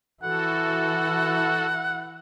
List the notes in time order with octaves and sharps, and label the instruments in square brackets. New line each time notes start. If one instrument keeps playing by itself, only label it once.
[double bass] E3 E4 [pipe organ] F#4 A4 [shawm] F#5